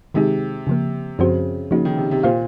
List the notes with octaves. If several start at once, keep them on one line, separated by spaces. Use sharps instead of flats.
C3 D#3 G#3 D#4 G#4
C#3 F3 A#3
F#2 C#3 F3 C4 F#4 C5
C#3 F3 A#3 D#4 F#4
D#3
C3
C3
A#2 A#3 F4 C5 F5